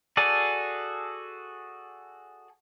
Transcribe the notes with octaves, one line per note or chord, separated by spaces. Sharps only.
F#4 G#4 A4 D5